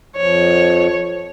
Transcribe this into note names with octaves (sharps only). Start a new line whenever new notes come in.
F2 F3 C#5